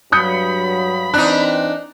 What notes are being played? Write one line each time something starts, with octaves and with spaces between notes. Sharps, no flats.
G2 F#3 B5 D#6 G6 C#7
E3 C4 D4 D#4 F#6